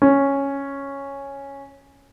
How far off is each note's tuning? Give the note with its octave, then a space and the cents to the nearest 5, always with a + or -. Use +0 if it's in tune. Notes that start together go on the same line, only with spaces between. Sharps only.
C#4 -5